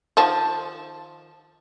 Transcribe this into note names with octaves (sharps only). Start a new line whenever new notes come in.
D#3 F3 A5